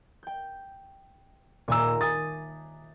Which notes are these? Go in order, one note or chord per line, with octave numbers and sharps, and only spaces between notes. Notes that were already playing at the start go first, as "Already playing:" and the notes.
G5 G6
D#1 A#2 G#5 A#5 E6
G#5 D6 D#6 A6